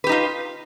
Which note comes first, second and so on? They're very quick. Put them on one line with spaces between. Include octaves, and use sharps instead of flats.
B4 G4 D#4 F4